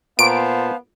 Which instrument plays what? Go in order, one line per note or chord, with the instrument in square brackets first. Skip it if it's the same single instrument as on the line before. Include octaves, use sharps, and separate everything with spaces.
[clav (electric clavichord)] A#2 [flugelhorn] B3 [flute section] C5 F5 A5 [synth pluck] D7